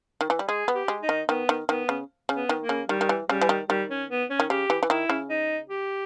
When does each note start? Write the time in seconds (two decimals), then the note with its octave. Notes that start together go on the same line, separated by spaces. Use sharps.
0.21 D#3
0.30 E3
0.39 G3
0.48 G#3 G#4
0.68 B3
0.75 G4
0.88 G#3
1.02 D#4
1.09 D#3
1.29 D#3 B3
1.49 D#3
1.69 D#3 B3
1.89 C#3
2.29 C#3
2.35 B3
2.49 D#3
2.62 A#3
2.69 C#3
2.89 D#3 G3
3.01 D#3
3.09 E3
3.29 C#3 G3
3.41 E3
3.49 D#3
3.69 D#3 G3
3.90 C#4
4.10 B3
4.30 C#4
4.40 D#3
4.50 C#3 G4
4.70 E3
4.83 E3
4.90 D#3 E4
5.10 C#3
5.29 D#4
5.70 G4